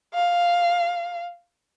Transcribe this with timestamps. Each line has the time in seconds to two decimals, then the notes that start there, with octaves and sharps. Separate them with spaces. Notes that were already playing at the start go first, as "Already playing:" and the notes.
0.15 F5